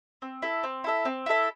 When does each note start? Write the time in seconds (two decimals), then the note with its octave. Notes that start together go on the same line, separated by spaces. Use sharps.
0.22 C4
0.42 E4 A4 E5
0.64 C4
0.84 E4 A4 E5
1.05 C4
1.26 E4 A4 E5